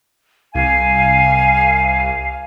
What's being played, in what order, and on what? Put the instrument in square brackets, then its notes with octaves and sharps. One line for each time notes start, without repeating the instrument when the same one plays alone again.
[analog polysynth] C2 [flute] F5 [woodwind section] G#5